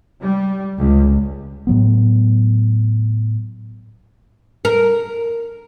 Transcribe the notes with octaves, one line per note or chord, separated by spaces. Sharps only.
G3
C#2
A2 F#3 B3
A#4